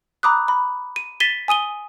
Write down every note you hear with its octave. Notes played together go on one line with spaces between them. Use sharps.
A#5 B5 D6 D#6 F#6
B5
D#7
A6 B6 D#7 E7 G7
G#5 D#6 D#7 G7